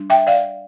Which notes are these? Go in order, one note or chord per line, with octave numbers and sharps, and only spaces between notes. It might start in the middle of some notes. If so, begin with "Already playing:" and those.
Already playing: G3 D4
E5 G5
D5 F5